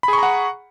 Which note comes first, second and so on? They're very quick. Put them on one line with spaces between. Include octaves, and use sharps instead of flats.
B5 G#4 C#6 A#5 F#5